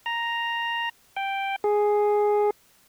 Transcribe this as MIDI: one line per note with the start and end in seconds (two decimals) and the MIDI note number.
0.06 0.89 82
1.16 1.56 79
1.64 2.50 68